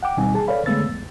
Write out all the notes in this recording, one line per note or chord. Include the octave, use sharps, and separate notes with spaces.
F#5 G5 D6
D2 B2 G3 C4 D#4 G#5
G#4 A5
A4 B4 C#5 D5 F5 B5
D3 G#3 A3 B3 E6 A6
F2